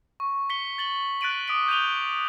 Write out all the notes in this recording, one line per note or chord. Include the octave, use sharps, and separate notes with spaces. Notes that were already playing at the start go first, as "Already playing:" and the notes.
C#6
B6 C#7 G7
A6 F#7 G7
F#6 A6 B6 D7 D#7 F#7
D6 D#6 B6 D7
G6 D#7 F7 G7